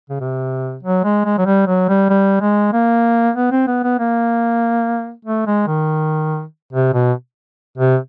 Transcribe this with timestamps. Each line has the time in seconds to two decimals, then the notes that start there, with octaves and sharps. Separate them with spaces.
0.10 C#3
0.20 C3
0.83 F#3
1.04 G#3
1.25 G#3
1.38 F#3
1.46 G3
1.67 F#3
1.89 G3
2.10 G3
2.41 G#3
2.73 A#3
3.36 B3
3.52 C4
3.67 B3
3.84 B3
3.99 A#3
5.25 A3
5.47 G#3
5.67 D#3
6.73 C3
6.94 B2
7.78 C3